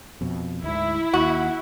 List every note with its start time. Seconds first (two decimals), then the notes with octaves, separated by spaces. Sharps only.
0.21 F2 B2
0.63 D2 G#2 E4
1.13 D#2 F#4